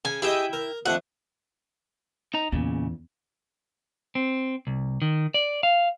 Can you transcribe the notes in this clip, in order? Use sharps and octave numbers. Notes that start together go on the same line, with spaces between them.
C#3 G#5
E4 G4 G#4 D#5 E5 G5
A#4
F2 A3 D4 F#5
D#4 D#5 A#5
E2 A#2 C#3
C4
C2
D#3
D5
F5